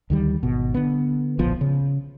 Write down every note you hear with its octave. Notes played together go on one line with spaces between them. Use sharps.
D2 D#3 G3
G#1 B2
D3 B3
D1 A#1 F3 B3
C#3